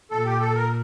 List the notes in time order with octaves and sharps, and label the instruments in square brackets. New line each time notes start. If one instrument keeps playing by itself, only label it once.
[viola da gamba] A#2 [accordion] A4
[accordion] G4
A4
A#4